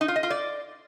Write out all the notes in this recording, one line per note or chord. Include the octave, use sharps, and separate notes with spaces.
D#4
F4
D#5
F4
D5